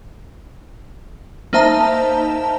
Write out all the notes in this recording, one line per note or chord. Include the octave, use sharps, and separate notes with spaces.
A#3 D#4 C5 E5 A5 A#5